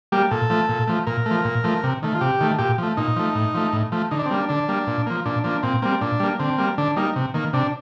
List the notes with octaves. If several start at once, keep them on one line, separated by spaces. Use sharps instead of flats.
G3 A#3 G4
A#2 A4
F3 A3
A#2
F3 A3
A#2 A#4
F3 A3
A#2
F3 A3
C3
D#3 A3
F4
C3 G4
D#3 A3
A#2 G4
F3 A3
A#2 D#4
F3 A3
A2
F3 A3
A2
F3 A3
D3 D#4
D4
C4
G3 A#3 D4
D3 D4
G3 A#3
A#2
F3 A#3
A#2 D4
F3 A#3 D4
A#2 C4
G3 A#3 C4
A#2 D4
G3 A#3
D3 C4
G3 A#3
D3 D4
G3 A#3 D#4
C3
D#3 A#3
C3 D4